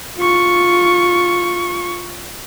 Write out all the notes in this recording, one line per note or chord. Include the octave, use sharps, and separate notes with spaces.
F4 C#6